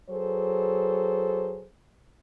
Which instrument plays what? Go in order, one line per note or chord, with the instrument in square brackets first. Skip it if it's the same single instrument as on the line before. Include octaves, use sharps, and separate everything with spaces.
[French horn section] F#3 G#4 A4 B4 C5